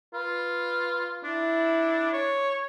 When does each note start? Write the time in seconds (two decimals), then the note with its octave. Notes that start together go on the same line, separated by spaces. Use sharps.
0.13 F4 B4
1.24 D4 E4
2.14 C#5